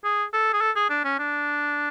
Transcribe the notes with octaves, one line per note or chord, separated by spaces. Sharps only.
G#4
A4
G#4
A4
G#4
D4
C#4
D4